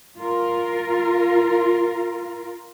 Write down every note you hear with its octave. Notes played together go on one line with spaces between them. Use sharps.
F4 A#4